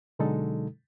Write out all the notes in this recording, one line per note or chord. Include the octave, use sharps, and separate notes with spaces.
B2 D3 F#3 G#3 D#4 A4